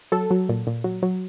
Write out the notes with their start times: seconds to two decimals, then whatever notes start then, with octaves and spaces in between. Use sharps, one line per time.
0.12 F#3 A4
0.31 F#3
0.49 A#2
0.67 A#2
0.84 F#3
1.03 F#3